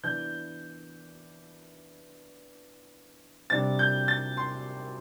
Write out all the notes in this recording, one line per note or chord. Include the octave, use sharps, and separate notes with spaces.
E3 B3 D4 G6
C3 G3 D4 A6
G6
A6
C6